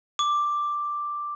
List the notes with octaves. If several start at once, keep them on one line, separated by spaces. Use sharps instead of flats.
D6